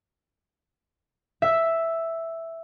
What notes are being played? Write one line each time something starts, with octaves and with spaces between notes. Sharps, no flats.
E5